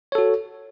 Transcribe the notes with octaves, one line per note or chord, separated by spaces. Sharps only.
F#4 A4 C#5